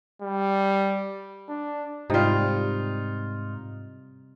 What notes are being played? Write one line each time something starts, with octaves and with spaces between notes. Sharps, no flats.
G3
D4
G#2 C3 G3 D#4 F4